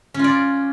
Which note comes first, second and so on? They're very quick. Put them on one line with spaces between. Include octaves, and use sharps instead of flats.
C#4 F4 D5